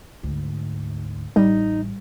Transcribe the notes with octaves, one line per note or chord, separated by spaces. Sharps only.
D2 G#2
A1 G3 D#4